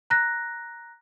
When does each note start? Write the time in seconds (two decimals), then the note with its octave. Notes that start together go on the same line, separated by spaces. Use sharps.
0.10 A#5 F#6 A#6